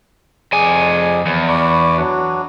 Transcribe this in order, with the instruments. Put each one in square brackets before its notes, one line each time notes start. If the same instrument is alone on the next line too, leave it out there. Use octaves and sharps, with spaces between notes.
[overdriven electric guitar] F2 G#5 [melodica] G#4 D5
[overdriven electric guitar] E2
[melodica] D5 B5 C#6
F#3 D4 F#4